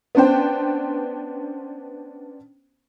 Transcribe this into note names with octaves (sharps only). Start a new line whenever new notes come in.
B3 C#4 D4 C5 G5